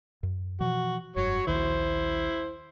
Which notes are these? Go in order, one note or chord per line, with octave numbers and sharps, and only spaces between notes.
F#2
B2 E3 F3 F#4
F1 G2 F#3 C#5
A#1 D#2 D#3 E4 C5